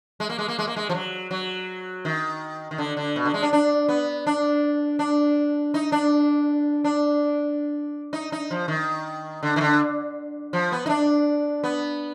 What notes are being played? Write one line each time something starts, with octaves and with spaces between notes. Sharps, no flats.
G#3
A#3
G#3
A#3
G#3
A#3
G#3
F3
F#3
F#3
D#3
D#3
D3
D3
B2
D3
G#3
D4
D4
B3
D4
D4
D#4
D4
D4
D#4
D#4
F3
D#3
D3
D#3
D3
F3
B3
D#4
D4
B3